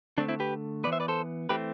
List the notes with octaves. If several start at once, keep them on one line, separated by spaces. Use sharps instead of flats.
D3 A3 C4 D4
C4 E4
G4 B4
E3 B3 B4 D5
C5 E5
B4 D5
A4 C5
E3 A3 C4 G4 B4